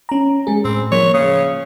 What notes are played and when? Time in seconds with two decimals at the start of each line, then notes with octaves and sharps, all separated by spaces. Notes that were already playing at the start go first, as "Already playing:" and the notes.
0.09 C#4 A#5
0.47 G#3 G#4
0.65 A2 C4
0.92 F3 A#3 C#5
1.14 C#3 D#6